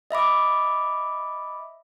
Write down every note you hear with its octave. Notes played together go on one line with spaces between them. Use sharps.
D#5 E5 B5 D6